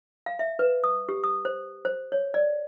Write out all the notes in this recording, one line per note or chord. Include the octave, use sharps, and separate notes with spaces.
F5
E5
B4
D#6
G4
D#6
C5
C5
C#5
D5